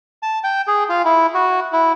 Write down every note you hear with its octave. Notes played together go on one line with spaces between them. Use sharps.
A5
G5
G#4
F4
E4
F#4
E4